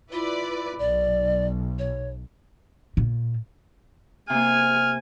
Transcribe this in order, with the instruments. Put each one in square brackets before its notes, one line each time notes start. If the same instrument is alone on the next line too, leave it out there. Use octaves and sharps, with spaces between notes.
[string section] E4 B4 D5 [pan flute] F4
[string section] B1 [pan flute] D5
[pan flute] C#5
[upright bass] A#2
[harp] C3 A#3 [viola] G#5 [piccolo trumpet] F6